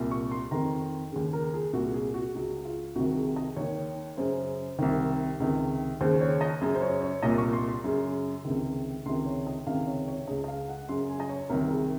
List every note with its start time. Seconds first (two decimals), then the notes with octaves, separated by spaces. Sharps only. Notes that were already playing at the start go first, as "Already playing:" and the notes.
Already playing: C2 A#2
0.11 C#6
0.31 C6
0.51 F2 D#3 A#5
1.12 D#2 C#3
1.33 A#4
1.54 G#4
1.73 C2 A#2 F#4
1.94 G#4
2.14 F#4
2.35 C#2 C#3 F#4
2.65 F4
2.96 C2 C3 D#3 F#4
3.16 G#4
3.36 D#5
3.57 D#2 D#3 C#5
4.17 F#2 C#3 C5
4.79 C2 C3 D#3
5.40 C#2 C3 D#3
6.01 D#2 C#3 C5
6.21 C#5
6.41 D#5
6.61 F#2 C#3
6.75 C5
6.82 C#5
7.02 C#5
7.23 C2 A#2 D#5
7.38 C#6
7.53 C6
7.68 C6
7.84 F#2 C#3
8.45 C#2 C3 D#3
9.06 C#2 C3 D#3 C6
9.26 C#5
9.47 D#5
9.67 C#2 C3 D#3 F5
9.87 C#5
10.08 C#5
10.28 C#2 C#3 D#5
10.44 D#5
10.48 F5
10.68 F#5
10.89 F#2 C#3 C6
11.10 G#5
11.20 D#5
11.30 C#5
11.49 C2 C3 D#3 A#4
11.70 G#4